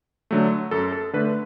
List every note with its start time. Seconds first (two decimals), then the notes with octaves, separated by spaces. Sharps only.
0.31 D3 F#3 A3
0.71 F#2 A4
0.92 A4
1.13 D3 A3 B4